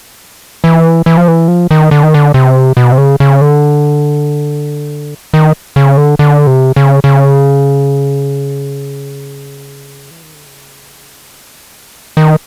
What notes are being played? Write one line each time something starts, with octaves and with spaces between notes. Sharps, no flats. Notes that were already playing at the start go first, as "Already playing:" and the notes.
E3
E3
F3
E3
F3
D#3
D3
D#3
D3
C3
B2
C3
C#3
C#3
D3
D#3
C#3
D3
D3
C3
C#3
C#3
E3
D#3
D3
C#3
D#3